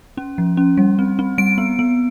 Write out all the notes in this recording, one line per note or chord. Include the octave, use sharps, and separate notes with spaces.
C#4
F3
C#4
G3
C4
C4
G3 D7
B3
B3